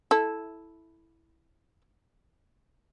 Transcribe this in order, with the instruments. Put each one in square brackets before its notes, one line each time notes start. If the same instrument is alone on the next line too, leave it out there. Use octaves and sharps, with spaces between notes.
[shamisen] E4 A4